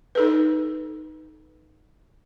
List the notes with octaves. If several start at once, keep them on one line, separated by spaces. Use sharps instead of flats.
D#4 A4 B4